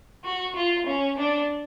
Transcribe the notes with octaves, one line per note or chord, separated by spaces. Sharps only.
F#4
F4
C#4
D4